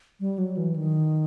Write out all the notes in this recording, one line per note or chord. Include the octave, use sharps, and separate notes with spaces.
G3
F#3
E3
D#3